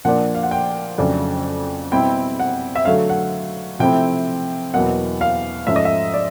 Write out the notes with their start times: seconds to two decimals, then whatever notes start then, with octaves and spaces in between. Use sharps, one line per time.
0.05 A#2 F3 A#3 D4 F#5
0.35 F5
0.43 F#5
0.51 G5
0.98 F2 C#3 F#3 A3 D4
1.92 B2 G3 C4 E4 G5
2.40 F#5
2.76 E5
2.85 D3 F#3 A3 F5
3.09 F#5
3.79 C3 F3 A3 C4 E4 G5
4.74 E2 B2 F#3 A#3 F#5
5.21 F5
5.67 G#2 F3 A3 C#4 E5
5.76 D#5
5.85 E5
6.14 D5